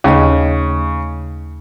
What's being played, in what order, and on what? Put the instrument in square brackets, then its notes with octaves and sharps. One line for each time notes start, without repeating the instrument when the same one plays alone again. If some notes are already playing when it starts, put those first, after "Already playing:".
[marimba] D#2 A3 D#5 [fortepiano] C#3